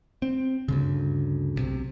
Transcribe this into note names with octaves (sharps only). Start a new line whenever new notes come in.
C4
D2 G2 C#3
B1 C3